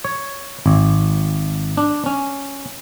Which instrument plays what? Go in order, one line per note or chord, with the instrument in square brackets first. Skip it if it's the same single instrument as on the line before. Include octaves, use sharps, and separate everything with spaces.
[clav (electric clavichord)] C#5
G#1
D4
C#4